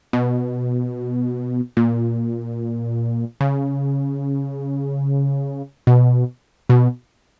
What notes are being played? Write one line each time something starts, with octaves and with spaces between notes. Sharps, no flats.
B2
A#2
C#3
B2
B2